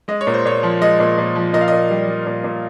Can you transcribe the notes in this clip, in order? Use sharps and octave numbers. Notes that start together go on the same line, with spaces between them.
G#3 D#5
C#5
A#2
C5
A#2 C#5
F3
G#3 D#5
A#2
A#2
F3
A#2 D#5
F5
A#2 D#5
G3
G3
A#2
A#2